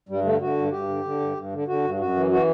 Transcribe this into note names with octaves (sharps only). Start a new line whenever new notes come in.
G2 G3
D3 A3
D3 F#4
G2
G2 G4
D3
D3
G2
G2
D3
D3 F#4
G2
F#2 F#4
E3
E3 F#4